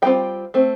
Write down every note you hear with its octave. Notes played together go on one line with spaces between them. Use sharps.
G3 C4 F4 G5
A3 C4